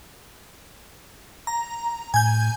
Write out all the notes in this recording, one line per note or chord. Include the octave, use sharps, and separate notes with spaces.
A#5
A2 G#5 G6